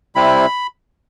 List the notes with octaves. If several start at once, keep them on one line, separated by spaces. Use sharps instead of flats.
C3 G3 C4 E4 B5